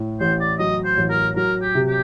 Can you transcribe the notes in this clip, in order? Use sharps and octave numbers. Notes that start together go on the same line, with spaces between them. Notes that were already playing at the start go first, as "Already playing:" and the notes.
Already playing: A2
A1 C5
D5
F#3 D#5
C5
A1
A#4
F#3 A#4
G4
C3
G4